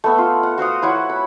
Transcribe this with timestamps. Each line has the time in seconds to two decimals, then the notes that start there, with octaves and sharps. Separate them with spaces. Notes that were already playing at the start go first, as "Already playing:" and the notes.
0.04 A3 B3 E5
0.18 F4
0.43 F#5
0.58 F#4 C5 F5 D#6
0.82 E4 F#4 C#5 F#5
1.10 B5